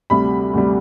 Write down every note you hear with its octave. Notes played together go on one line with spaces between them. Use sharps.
D2 C3 G3 B5
D2 C3 G3